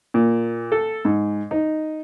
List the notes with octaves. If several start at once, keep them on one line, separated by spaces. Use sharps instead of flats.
A#2
A4
G#2
D#4